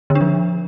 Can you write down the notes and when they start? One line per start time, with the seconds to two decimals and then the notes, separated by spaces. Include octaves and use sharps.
0.10 D3
0.15 D4
0.21 F3